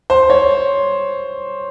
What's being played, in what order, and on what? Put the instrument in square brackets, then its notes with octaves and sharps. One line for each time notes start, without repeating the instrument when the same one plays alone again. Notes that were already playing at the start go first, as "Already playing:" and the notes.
[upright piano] C5
C#5